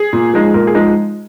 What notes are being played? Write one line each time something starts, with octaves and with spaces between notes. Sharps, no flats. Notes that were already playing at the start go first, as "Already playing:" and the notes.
Already playing: G#4
A#2
F3 G#3 D#4
A#2 A#4
G#4
F3 G#3 D#4